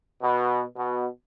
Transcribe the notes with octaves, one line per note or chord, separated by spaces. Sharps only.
B2
B2